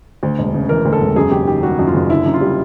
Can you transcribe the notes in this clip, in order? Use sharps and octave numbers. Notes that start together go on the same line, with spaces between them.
D2
E1
C#3
E3 A#4
D2
A4
E1
F#2 G#4
F#1 G4
D#3 G4
G3 F#4
F#2
F4
F#1
D3 E4
F#2
F4
G3